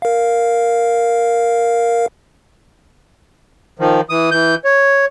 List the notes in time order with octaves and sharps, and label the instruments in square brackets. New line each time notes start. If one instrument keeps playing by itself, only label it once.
[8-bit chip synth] A#4 F5
[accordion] D#3 F3
E3 D#6
E3 G6
C#5